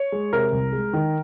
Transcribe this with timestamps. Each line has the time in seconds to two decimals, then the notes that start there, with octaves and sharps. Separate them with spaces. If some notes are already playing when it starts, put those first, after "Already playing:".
Already playing: C#5
0.12 G#3
0.33 C3 A#4
0.52 C2
0.73 G#3
0.93 D#3